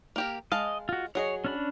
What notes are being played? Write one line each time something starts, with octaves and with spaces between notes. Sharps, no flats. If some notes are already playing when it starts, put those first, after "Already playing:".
A#3 G4 A#4
G#3 D#5 F5 A5
F4 F#4
F#3 G#4 C#5 D#5
C#4 D4 B5